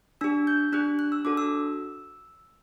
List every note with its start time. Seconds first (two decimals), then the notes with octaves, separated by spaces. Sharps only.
0.21 D4 G4 E6
0.47 G6
0.73 D4 G4 F#6
0.99 F#6
1.12 E6
1.25 D4 F#4 A4 D6
1.37 E6